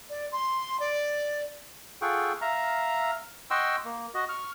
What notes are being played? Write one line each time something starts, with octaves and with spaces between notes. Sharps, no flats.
D5
C6
D5
F4 G#4 A4 F#5 G5 C#6
E5 F5 A#5
D#5 F#5 G5 C6 C#6 E6
A#3
F#4 D#5
C#6 F6